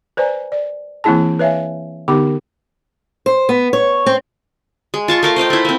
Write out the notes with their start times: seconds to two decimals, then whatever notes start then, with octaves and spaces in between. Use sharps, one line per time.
0.17 B4 C5 D5 G#5 A#5
0.52 D5
1.04 E3 A#3 C4 E4 G#4 A5
1.39 B4 C#5 E5 F5 G#5
2.08 D3 B3 D#4 G4 A#4 D6
3.26 C5
3.49 B3
3.73 C#5
4.06 C4
4.94 G#3
5.08 F4 A5 C#6
5.23 A3 A#4 F5
5.36 C5 D#5 F5 G5
5.50 A3 E4
5.65 A#3 C4